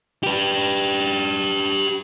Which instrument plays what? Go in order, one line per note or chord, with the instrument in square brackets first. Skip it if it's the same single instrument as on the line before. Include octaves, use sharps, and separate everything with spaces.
[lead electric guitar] G4 B4